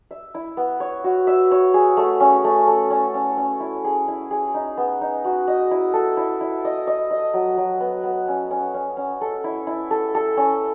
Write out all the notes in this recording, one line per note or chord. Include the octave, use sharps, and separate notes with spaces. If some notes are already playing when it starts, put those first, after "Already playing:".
E5
E4
B3
C#5
F#4
E5
C#5
G#4
A3
C#4
A3
A4
C#4
C#4
C#4
E4
G#4
E4
G#4
D#4
B3
D#4
F#4
D#5
E4
A4
E4
E4
D#5
D#5
D#5
F#3
F#3
B3
B3
C#4
C#4
C#4
C#4
A4
E4
E4
A4
A4
C#4